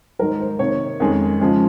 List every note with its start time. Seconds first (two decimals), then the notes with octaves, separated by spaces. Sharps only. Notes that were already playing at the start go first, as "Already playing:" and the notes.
0.19 G#2 D#3 F#3 A#4
0.40 C5
0.59 C3 D#3 A#3 C#5
1.00 F2 D#3 G#3 C#4
1.40 C#3 F3 G#3 C#4